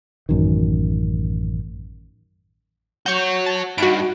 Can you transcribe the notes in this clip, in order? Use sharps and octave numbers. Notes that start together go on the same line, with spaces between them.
A1 F#2 D#3
F#3 F#4 C#5 C#6 G6
A5
G2 D#4 F#4 D7